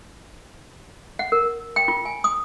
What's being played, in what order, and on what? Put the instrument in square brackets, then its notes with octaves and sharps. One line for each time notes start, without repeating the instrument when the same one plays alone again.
[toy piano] F#5
A#4
G5
F4
G#5
D#6